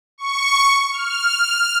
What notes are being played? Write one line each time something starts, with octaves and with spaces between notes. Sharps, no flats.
C#6
F6